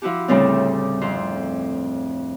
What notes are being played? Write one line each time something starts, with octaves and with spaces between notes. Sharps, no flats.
F3 E4 F#4 G4
D2 A2 C#3 G3 C4
F2 C5